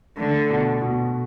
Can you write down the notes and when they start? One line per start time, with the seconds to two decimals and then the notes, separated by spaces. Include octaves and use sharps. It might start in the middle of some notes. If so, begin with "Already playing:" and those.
0.17 D3 A3
0.50 B2
0.81 B2